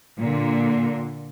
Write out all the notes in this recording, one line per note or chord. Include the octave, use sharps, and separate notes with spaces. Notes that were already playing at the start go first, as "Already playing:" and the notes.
A#2 D3